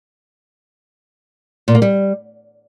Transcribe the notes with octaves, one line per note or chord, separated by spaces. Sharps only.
A#2
A#3
G3